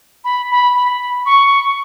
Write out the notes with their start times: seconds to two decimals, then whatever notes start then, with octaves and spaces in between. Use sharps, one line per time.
0.24 B5
0.50 B5
0.75 B5
1.26 C#6